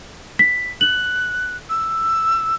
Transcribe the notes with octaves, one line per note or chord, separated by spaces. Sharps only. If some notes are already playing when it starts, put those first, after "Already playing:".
B6
F#6 F#7
E6